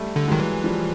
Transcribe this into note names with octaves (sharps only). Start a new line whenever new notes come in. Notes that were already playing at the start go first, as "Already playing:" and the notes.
Already playing: G3 A3
D3
D#3 F#3 G#3
E3
F3 G3